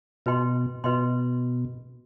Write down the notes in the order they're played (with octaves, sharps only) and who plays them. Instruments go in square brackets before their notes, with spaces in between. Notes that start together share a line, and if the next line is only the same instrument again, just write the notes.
[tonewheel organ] B2 [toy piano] F#4 B4 D#5 G5 C6
[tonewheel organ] B2 [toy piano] F#4 B4 D#5 G5 C6